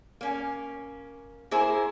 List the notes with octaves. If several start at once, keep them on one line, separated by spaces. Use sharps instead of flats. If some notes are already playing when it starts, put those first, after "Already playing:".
A#3 C#4
A#3 E4 G#4 C5